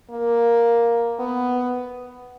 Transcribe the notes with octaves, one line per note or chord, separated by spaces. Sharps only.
A#3
B3